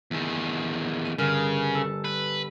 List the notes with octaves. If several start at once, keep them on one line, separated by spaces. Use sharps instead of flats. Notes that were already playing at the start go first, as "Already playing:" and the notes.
E2 D#3
D#7
G1 C#3 A#4 F6
A4
B4